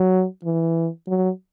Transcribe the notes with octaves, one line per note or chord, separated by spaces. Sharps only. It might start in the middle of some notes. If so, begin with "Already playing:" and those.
Already playing: F#3
E3
F#3